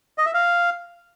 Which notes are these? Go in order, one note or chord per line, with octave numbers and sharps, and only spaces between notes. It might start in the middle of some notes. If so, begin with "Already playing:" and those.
D#5
E5
F5